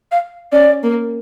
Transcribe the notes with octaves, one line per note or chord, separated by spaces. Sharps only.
F5
C#4 D5
A#3